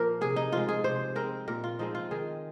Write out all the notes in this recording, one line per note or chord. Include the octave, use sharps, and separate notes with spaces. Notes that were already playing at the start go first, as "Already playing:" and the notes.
Already playing: A#2 F3 A#3 A#4
C3 G#4
D#4
F3 G#3 F4
G#4
C3 C5
G#3 C4 A#4
A#2 A#4
F4
F3 G#3 C4 D#4
F4
D#3 G#4